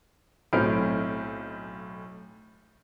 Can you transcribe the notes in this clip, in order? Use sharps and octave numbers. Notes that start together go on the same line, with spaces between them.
B1 A2 C4 F6 D7